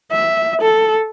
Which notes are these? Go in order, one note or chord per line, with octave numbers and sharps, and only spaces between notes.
E5
A4